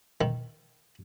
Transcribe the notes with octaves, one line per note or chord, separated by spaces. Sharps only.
D#3